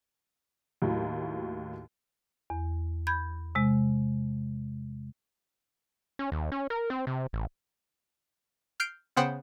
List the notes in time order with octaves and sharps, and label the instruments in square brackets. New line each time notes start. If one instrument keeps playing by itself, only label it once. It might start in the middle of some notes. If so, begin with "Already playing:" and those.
[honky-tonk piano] D#2 A2 F#3
[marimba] E2
B5 G6 G#6
C3 G#3
[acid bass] C#4
D#2
C#4
A#4
C4
C3
A1
[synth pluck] F6 G6 C7 D7
C#3 B3 C5 F#5 G5